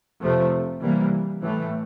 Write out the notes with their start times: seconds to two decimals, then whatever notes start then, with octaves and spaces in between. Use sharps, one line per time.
0.21 F2 C3 F3 A3
0.81 C3 E3 G3 A#3
1.41 A2 E3 A3